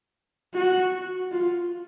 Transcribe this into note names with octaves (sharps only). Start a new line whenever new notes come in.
F#4
F4